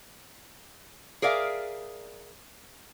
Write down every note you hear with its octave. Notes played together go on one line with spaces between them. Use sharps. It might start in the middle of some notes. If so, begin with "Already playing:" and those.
G#4 A#4 D5 E5 F5